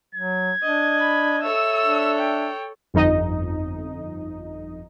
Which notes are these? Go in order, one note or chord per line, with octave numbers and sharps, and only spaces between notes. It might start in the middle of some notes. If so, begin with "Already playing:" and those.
F#3 G#6
D4 D#5
B5
A4 C#5 E5 E6
D4
G5
G1 F2 D#4 D#5